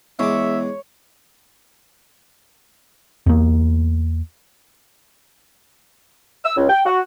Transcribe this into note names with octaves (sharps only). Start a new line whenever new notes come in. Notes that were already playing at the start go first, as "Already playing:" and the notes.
E2 G#3 C#5 E5 D6
E2 A#3
E6
C#2
G5
F#4